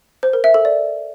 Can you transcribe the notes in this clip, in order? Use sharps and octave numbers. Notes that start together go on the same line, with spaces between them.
C5
A#4
E5
A4
D5